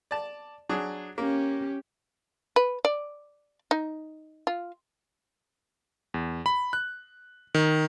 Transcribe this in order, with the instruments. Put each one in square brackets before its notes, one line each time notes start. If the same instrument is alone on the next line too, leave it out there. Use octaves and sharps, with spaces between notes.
[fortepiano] D5 A5
F#3 D4 G#4
[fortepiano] A#3 [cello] C#4 G4
[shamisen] B4
D5
D#4
F4
[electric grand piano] E2
B5
F#6
D#3